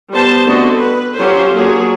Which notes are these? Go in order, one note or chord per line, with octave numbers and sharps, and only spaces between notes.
G3 B3 C5 A5
D3 A3 B3 C4 F#4 D#5
B4
F#3 C#4 F4 G4 A4 C5
F#3 A#3 D4 G#4